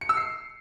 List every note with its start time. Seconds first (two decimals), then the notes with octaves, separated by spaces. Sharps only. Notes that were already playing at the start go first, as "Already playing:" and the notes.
0.01 C#7
0.09 E6
0.17 C7